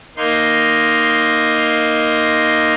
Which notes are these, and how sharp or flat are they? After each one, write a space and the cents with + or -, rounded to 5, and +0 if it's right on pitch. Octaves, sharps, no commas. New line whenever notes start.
A#3 +0 D#4 +0 C6 +0